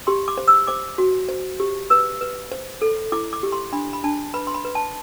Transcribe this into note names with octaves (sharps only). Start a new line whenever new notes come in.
G4 C6
D6
C5
E6
C5 D6
F#4
C5
G4
B4 E6
B4
C5
A4
E4 D6
D6
G4
C6
D4 B5
B5
D4 A5
B4 B5
C6
B5
B4
A5